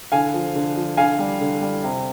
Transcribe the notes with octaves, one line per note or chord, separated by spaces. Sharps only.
D3 F5 G#5
F3
D3
F3
D3 F5 G#5
G3
D3
G3
C3